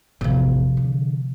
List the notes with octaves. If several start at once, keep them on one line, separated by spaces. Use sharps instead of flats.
A1 E2 C3 F3
D3